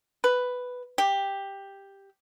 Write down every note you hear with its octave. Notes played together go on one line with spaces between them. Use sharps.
B4
G4